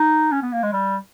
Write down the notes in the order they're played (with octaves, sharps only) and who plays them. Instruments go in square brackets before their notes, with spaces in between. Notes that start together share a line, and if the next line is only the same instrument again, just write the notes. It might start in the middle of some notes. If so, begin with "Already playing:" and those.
Already playing: [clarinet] D#4
C#4
B3
A#3
G#3
G3